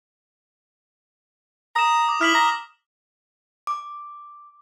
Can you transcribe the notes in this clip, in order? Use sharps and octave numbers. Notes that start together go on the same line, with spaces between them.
A#5 D#6 E7
D6
E4 F6 B6 F#7
A#5 A#6
D6